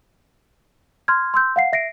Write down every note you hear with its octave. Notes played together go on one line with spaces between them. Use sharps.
C6 F6 G#6
C6 E6 G6
F5 F#5 C7
E5 A#6 C7 D7